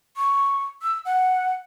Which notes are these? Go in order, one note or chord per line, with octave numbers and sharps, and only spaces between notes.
C#6
E6
F#5